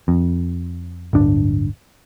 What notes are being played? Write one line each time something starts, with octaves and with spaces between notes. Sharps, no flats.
F2
D1 G1 D4